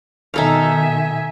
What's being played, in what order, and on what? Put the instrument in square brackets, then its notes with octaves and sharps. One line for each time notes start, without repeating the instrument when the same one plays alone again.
[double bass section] B2 D#3 [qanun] D#4 A4 F5 [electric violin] E5 G#5